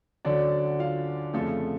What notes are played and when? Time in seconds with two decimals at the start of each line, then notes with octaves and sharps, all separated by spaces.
0.25 D2 D3 F#3 C#4 D4 D5
0.79 F4 F5
1.34 F2 C#3 F3 A3 A4